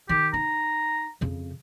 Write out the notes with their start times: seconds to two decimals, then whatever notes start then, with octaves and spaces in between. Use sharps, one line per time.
0.09 D#3 G4
0.34 D#4 A#5
1.21 F2 C#3